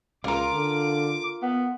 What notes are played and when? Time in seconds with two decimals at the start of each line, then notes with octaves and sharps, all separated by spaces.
0.24 C#2 F4 A#4 D6
0.53 D3
1.42 B3